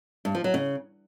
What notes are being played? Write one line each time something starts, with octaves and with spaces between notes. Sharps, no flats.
G2
F3
F#3
C#3